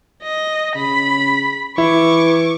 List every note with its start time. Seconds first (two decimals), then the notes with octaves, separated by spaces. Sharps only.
0.23 D#5
0.76 C#3 B5
1.78 E3 E4 C#6 D6